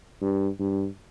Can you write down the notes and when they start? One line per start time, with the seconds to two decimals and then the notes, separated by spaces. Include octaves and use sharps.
0.22 G2
0.60 G2